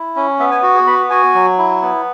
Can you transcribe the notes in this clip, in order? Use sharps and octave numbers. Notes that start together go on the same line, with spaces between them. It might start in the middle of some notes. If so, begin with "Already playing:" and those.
Already playing: E4
C#4
B3 E5
G#5
F#4
G#4
B3 B5
F#4 G#5
F#3
E4
B3